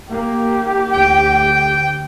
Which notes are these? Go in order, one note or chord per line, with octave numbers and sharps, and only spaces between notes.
A#3 G4
D2 G5